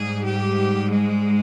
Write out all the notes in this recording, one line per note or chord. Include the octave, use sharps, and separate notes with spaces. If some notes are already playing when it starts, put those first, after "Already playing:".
Already playing: G#2 G3 G#4
G4
G#3